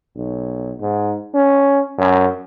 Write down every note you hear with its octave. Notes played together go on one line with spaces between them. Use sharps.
B1
G#2
C#4
F#2